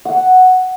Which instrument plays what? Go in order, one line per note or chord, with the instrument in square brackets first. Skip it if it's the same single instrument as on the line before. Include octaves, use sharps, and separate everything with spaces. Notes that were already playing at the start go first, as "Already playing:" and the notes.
[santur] F#5